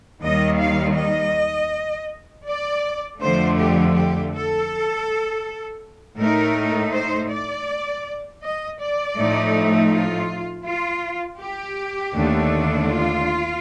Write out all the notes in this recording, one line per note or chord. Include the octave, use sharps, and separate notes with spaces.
D#2 D#3 G3 D#5
F5
D#5
D5
F2 D3 F3 A3 C5
G4
G4
A4
A2 A3 D#4 A#4
C5
D5
D#5
D5
A2 F3 A3 D#4
F4
F4
G4
D#2 D3 A3 D4
F4